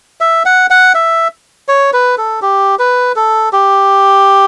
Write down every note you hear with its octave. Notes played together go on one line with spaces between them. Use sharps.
E5
F#5
F#5
E5
C#5
B4
A4
G4
B4
A4
G4